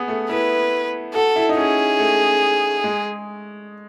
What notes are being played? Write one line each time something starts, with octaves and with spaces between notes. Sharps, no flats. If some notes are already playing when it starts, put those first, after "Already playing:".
Already playing: B3 G#4
A3
E4 B4
F#4 A4
E4
D#4
C#4 G#4
A3
G#3